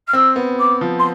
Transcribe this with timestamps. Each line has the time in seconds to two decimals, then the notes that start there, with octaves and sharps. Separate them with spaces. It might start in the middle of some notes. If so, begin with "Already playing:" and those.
0.07 F6
0.13 C4 E6
0.36 B3
0.59 D6
0.81 F3
0.99 C6